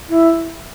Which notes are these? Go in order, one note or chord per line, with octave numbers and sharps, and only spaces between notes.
E4